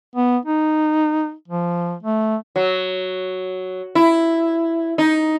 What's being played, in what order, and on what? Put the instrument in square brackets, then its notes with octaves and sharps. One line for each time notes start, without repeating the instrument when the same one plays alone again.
[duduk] B3
D#4
F3
A3
[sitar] F#3
E4
D#4